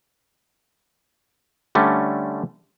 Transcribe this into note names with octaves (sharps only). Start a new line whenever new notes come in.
D3 G3 A3 C#4